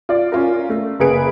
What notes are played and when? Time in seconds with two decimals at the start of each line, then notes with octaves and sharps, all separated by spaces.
0.09 F4 D5
0.32 C#4 F4 A#4
0.70 A3
1.00 F#1 A#3 G#4 B4 D7